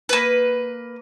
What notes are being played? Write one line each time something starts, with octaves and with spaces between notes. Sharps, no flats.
A#3 B4